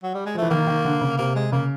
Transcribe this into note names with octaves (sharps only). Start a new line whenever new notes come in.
F#3
G3
G#3
F3
E3 A3
D#3 A#3
D#3
D3
C#3
C3 A#3
G#3
C#3 A#3